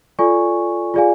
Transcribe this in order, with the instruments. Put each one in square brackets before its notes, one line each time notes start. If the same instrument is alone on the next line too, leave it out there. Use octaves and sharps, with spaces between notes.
[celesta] F4 A4 D5 G#5 C#6
F4 G#4 D5 F5 G#5